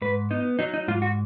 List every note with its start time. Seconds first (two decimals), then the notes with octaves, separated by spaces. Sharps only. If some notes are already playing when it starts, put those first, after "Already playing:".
0.02 G#2 B4
0.31 B3 D#4
0.59 F#3 D#4
0.74 D#4
0.88 G#2 F4
1.02 F#4